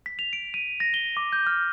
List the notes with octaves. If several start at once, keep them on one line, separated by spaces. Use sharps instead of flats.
B6
F7
D7
D#7
A#6
G7
D6
G6
F6